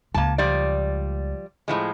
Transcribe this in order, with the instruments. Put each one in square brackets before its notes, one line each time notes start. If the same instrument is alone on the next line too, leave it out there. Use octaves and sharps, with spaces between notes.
[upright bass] C#2 G#3 [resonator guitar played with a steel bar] A#3 A5
[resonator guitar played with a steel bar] F3 G3 D5
A2 F3 G#3